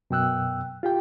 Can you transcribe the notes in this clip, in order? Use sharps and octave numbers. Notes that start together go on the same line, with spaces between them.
F#2 B2 G5 E6 F#6
F4 G4 G5